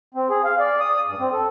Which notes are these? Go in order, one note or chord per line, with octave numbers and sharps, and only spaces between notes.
C4
G#4
F5
D5
D#6
G2
C4
A4